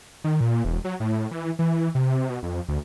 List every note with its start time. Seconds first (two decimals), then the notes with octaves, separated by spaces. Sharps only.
0.24 D#3
0.41 A#2
0.65 E1
0.84 F#3
1.00 A2
1.31 E3
1.59 E3
1.95 C3
2.30 B2
2.43 F2
2.68 D2